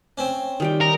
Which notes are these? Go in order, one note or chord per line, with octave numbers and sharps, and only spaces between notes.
C4 C#4
D#3 G3 G5
D#4 A#4